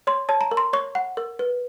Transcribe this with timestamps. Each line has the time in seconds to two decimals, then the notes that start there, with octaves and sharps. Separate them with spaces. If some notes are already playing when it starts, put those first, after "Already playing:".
0.07 C#5 C6
0.29 C#5 A5
0.41 A#5
0.51 A#4
0.57 C6
0.73 C#5 C#6
0.95 F#5
1.17 A#4
1.39 B4